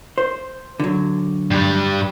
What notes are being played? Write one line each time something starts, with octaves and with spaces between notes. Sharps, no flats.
C5
D3 F#3
G2 G3